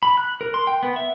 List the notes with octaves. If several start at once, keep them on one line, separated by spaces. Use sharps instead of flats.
B5
F#6
A#4
C6
G5
B3
E5